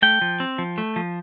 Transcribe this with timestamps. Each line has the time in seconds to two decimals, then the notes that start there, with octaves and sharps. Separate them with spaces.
0.02 A3 G5
0.21 F3
0.40 C4
0.58 F3
0.78 A3
0.96 F3